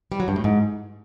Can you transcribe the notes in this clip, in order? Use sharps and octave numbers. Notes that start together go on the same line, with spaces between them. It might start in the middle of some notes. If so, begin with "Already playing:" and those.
G3
F#3
G2
A2
G#2